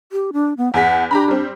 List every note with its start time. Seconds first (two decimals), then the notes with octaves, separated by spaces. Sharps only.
0.12 G4
0.33 D4
0.57 B3
0.74 E2 G#4 F#5 B6
1.11 D4 G4 A#5 B5
1.28 G3 C4